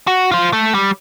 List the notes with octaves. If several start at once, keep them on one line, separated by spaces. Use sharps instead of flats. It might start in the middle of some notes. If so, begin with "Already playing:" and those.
F#4
F4 C5
A3
G3